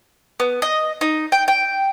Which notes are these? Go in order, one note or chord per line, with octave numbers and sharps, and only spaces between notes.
B3
D#5
D#4
G5
G5